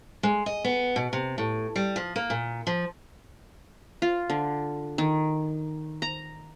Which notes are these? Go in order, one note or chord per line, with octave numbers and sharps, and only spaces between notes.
G#3
D#5
B3
B2
C3
A2
G3
F3
A#3
A#2
F3
F4
D3
D#3
A#5